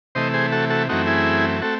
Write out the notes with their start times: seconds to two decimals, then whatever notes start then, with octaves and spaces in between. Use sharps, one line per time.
0.15 C3 E3 A3 C5 D#5
0.34 G#4 C5
0.52 F#4 A4
0.70 F#4 A4
0.89 F#2 E3 A3 C4 D#4 F#4
1.07 E4 G#4
1.62 A3 C4 F#4 A4